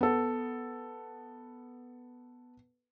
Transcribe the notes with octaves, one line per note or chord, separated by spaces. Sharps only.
B3 A4